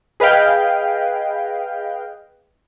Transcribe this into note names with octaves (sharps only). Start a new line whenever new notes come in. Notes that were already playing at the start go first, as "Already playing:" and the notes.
G#4 B4 D#5 F5 G5